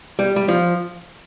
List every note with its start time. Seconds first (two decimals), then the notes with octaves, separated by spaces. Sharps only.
0.19 G3
0.36 G3
0.48 F3